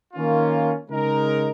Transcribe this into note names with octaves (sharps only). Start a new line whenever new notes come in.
D#3 A#3 C#4 F4
C#3 G#3 D#4 A#4